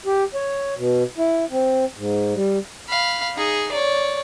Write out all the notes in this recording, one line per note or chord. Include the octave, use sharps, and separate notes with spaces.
G4
C#5
B2
E4
C4
G#2
G3
F5 B5
D#4 G#4
C#5 D5